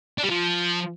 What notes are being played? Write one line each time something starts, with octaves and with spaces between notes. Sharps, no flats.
D4
G3
F3